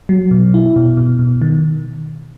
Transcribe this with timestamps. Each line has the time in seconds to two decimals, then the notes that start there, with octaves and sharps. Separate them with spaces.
0.09 F#3
0.31 B2
0.54 E4
0.76 B2
0.97 B2
1.19 B2
1.42 D#3